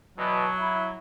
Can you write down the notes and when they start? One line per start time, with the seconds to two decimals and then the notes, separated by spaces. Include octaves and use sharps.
0.18 E2 B2 F#3
0.58 E4